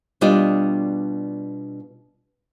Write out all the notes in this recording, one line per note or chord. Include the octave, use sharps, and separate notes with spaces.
B2 G3 D4 F4 D5 D#5